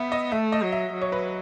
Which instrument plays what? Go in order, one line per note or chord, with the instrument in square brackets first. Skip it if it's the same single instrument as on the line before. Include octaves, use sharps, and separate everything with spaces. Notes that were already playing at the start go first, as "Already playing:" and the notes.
Already playing: [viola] B3 [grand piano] E5
[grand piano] D#5
[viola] A3 [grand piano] E5
[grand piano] D#5
[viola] F#3
[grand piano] E5
[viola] F#3
[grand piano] C#5
B4